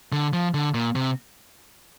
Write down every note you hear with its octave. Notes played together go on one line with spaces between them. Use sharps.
D3
F3
D3
A#2
C3